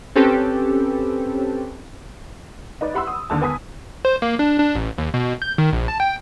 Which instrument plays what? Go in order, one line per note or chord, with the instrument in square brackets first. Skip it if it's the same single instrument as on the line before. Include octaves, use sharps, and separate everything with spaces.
[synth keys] C4 C#4 G4 A4 B4
[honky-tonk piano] D#4 B4 D5
E4 G4 F#5 B5 C6 E6
D#6
D#2 D3 A5
B3 G#5 D#6 B6
[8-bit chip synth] C5
A#3
D4
D4
A1
D#2
B2
G6
D#3
A#1
A5
G5